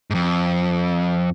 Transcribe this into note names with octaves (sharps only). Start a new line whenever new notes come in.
F2 G#2